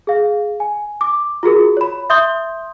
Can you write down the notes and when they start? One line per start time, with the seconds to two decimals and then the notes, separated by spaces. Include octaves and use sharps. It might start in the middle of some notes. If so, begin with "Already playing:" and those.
0.07 G#4 F5
0.60 G#5
1.01 D6
1.43 F4 F#4 G#4 A#4
1.77 C#5 B5
2.10 E5 C6 D#6 G6 G7